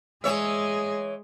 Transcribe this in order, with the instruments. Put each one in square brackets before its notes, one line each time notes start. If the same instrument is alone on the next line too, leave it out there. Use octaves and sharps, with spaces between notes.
[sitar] E3 C#5 E5 [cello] G#3 G#4